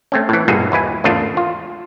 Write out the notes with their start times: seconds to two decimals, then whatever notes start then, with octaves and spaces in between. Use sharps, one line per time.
0.12 A3 C4 C#4
0.29 A2 E3
0.48 B1 G2 A#2 F#4 G#4
0.72 D#2 E4 B4 G#5
1.04 G#1 E2 C#3 A3 D4 F4
1.37 F4